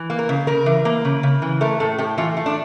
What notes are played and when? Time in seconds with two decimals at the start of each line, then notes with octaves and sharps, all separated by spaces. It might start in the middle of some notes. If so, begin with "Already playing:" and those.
Already playing: E3
0.10 A#3
0.19 A#4
0.29 C#3
0.47 C#3 A#4
0.66 E3
0.85 A#3
1.05 C#3
1.23 C#3
1.42 E3
1.61 A3 A#4
1.80 A2 A4
1.98 A2 G4
2.18 E3 F4
2.37 A3
2.46 D4